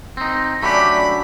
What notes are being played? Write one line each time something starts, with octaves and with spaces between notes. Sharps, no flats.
C4 D#4
F#3 A3 C#4 D4 G4 B5